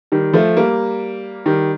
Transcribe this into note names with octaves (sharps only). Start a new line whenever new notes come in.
D#3 G3
F3 A3
G3 A#3
D#3 G3